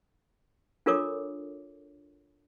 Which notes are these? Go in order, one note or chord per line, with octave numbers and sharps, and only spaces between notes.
D4 F4 A4 A#4 C#5 D6